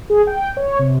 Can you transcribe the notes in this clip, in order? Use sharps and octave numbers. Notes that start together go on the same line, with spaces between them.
G#4
G5
C#5
C3